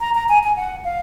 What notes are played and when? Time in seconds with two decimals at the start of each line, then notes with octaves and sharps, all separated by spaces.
0.01 A#5
0.15 A#5
0.29 G#5
0.43 G#5
0.56 F#5
0.84 F5